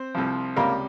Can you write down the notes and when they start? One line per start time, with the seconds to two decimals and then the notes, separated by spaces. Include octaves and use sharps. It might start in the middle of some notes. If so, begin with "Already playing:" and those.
Already playing: C4 C5
0.15 C2 C3 F3
0.56 C#2 C3 G3 A#3 A#4